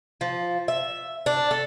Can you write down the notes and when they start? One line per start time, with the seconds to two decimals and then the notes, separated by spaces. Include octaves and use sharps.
0.21 F3
0.68 E5
1.26 D4
1.51 A4